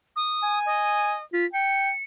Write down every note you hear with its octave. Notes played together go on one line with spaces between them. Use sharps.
D#6
G#5
D#5
F4 B6
G5 C#7